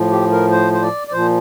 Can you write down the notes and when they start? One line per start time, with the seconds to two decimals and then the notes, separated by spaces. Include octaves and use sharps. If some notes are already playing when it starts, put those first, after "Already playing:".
Already playing: A2 F3
0.11 G4
0.31 A#4
0.51 C5
0.73 C5
0.82 D5
1.07 D5
1.13 A#2 F3 C5